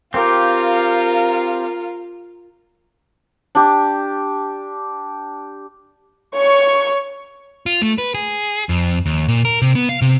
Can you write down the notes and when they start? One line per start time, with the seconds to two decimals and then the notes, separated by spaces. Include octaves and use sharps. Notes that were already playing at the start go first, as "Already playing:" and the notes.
0.14 C4 F4 G4 A#4 F5
3.55 D4 G4
6.36 C#5 C#6
7.66 F4
7.82 A3
7.98 B4
8.14 G#4
8.69 F2
9.06 D#2
9.28 A#2
9.45 A#4
9.62 C3
9.75 B3
9.89 F5
10.02 C3